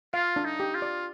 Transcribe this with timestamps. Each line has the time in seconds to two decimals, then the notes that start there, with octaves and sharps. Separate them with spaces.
0.14 F4 F5
0.36 D4
0.45 D#4
0.60 G4
0.75 F4
0.82 D5